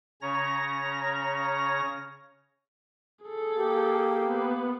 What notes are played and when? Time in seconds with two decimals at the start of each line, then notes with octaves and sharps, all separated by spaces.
0.22 C#3 C#4 C#5 A#5 A#6
3.25 G#4 A4
3.57 A#3 G4
4.24 B3